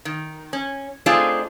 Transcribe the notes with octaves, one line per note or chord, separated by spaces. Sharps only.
D#3
C#4
A3 C4 D4 D#4 F4 G#4